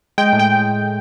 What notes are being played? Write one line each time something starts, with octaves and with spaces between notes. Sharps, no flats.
G#3 G5
A2
G5